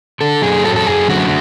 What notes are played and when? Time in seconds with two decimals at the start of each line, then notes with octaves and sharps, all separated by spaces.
0.21 D3 A4
0.42 F#2 G#4
0.65 F#3 A4
0.76 A4
0.87 F#2 G#4
1.09 D3 F#4